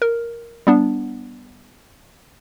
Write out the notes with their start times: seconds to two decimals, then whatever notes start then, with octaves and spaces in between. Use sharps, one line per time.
0.02 A#4
0.67 G3 B3 D4